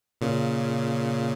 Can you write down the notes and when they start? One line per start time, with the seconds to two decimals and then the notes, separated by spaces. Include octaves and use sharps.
0.21 A#2 C#3